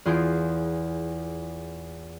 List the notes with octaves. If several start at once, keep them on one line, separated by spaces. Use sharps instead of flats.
E2 F4 G#4 C6 G6 D7